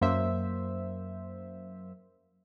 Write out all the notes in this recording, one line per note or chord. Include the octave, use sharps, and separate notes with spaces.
F#2 A#3 C5 E5